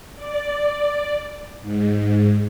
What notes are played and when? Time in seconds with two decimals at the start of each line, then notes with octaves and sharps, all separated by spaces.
0.16 D5
1.62 G#2